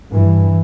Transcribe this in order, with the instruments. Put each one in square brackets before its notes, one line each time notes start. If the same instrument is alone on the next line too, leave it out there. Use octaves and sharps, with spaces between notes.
[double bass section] G2 E3